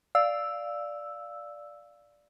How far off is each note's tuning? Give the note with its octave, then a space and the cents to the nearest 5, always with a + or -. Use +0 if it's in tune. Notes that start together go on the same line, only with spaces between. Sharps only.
D5 +0 F5 +0 E6 +0